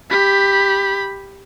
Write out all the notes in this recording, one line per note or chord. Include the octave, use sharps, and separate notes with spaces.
G4 B5